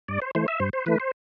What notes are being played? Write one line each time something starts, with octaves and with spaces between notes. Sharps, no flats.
G2 D5
C5
E3 A3 C5
E5
G2 C5
C5
E3 A3 B4
C5